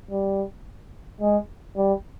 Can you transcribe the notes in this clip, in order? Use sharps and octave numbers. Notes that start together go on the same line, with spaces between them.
G3
G#3
G3